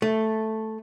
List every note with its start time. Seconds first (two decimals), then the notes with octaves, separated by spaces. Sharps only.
0.02 A3